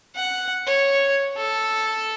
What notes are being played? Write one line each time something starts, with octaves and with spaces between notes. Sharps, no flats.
F#5
C#5
A4